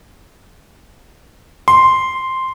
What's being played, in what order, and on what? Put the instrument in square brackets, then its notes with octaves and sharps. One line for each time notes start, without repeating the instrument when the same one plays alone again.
[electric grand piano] C6